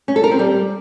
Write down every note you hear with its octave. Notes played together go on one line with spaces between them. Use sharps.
C#4
A4
A#4
C4
G3